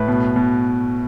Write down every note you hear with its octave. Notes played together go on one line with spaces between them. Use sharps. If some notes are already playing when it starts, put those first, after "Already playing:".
Already playing: A2 B4
B2
B2